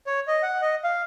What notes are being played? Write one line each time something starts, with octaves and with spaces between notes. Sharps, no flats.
C#5
D#5
F#5
D#5
F5